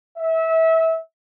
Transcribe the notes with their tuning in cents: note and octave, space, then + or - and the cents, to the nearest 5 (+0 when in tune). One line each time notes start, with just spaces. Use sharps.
E5 -25